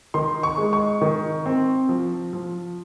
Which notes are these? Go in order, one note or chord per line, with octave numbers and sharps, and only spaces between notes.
D#3 C6
C#6
G#3
C#6
D#3
C4
F3
F3